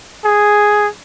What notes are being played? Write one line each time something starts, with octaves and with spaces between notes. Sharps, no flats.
G#4